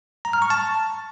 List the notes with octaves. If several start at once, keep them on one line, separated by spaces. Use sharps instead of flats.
A#5
F6
C#6
A5